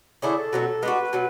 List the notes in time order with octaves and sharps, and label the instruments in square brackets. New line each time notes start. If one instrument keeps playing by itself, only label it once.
[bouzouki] D3 A3 C#4 E4 [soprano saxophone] G#4
[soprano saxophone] A4
[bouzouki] B2 F#3 C#4
[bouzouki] G#3 D4 F#4 [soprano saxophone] B4
[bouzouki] B2 F#3